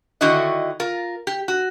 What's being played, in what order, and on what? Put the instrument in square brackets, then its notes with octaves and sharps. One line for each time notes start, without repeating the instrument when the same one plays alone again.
[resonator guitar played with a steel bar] D3 D#3 D#4 E4 F#4 D#5
F4 A#4
G4
F#4